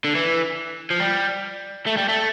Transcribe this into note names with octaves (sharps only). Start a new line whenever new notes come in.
D3
E3
F3
G3
A3
G3
A3